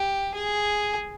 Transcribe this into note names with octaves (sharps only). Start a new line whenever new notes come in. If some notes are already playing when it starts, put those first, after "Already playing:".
Already playing: G4
G#4